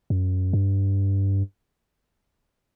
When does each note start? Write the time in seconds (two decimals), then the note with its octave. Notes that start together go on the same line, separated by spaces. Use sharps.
0.10 F#2
0.53 G2